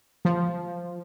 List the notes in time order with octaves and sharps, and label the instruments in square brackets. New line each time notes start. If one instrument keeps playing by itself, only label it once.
[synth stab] F3